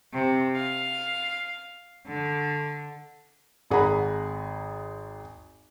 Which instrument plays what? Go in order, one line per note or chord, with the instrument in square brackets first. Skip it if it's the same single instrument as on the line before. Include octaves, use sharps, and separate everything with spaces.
[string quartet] C3
F5
D3
[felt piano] G#1 G#4 F#5 A#5 B5